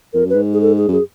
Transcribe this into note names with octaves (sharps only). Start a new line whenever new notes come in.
F2 A#4
F#2
G#2 B4
G#4
A4
G#4
F#2 G#4